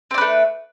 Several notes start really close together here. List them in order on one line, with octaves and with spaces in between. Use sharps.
C4 D4 B4 A3